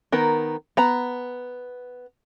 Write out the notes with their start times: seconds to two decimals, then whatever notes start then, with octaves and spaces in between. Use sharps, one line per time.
0.12 D#3 B3 A#4
0.77 B3 A#5